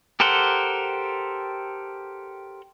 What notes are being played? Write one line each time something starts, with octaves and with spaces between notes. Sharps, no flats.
G4 A4 A#4 C5 F#5